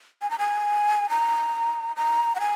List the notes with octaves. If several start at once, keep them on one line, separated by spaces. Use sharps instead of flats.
G#5
A#5
G#5
A#5
A#5
F#5
G#5